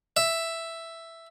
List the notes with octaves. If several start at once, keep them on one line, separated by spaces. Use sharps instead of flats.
E5